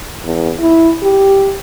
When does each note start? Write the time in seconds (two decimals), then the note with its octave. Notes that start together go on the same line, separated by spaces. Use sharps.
0.24 E2
0.60 E4
1.03 G4